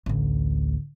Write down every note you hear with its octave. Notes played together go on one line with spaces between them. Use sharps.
A1 D2